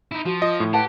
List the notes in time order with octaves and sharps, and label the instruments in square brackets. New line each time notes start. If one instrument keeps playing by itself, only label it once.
[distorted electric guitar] D#4 E4
[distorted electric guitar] F3 [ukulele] F#4
[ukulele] F4 [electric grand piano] D#5
[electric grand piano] A2
[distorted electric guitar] G4 [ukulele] B4 F#5 A5